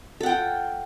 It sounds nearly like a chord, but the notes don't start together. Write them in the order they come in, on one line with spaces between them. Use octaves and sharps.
A4 F#5 G5 F4